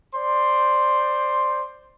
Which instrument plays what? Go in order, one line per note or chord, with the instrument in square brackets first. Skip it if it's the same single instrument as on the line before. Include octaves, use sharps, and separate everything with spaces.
[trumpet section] C5 D5 C6